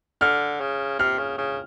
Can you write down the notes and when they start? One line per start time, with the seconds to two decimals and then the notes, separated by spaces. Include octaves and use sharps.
0.21 D3 F6
0.60 C#3
0.99 C3 F6
1.19 C#3
1.38 C#3